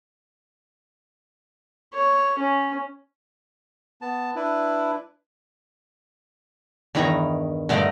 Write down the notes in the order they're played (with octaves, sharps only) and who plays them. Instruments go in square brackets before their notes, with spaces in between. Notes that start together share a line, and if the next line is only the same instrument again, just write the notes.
[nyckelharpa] C#5
C#4
[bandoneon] B3 A5
D4 E4 B4
[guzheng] E2 G2 D#3 B4 C#5 A#5
G2 D3 A3 D5 D#5 A#5